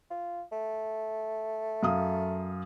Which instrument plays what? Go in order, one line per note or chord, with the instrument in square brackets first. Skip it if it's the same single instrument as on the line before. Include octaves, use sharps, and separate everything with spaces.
[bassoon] F4
A3
[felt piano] F#2 F5 D#6